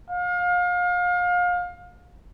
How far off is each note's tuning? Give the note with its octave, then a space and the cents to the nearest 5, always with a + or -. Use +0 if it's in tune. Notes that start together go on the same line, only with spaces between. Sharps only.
F5 +30